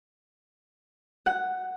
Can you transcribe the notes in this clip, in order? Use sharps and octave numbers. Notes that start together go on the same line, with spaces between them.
F#5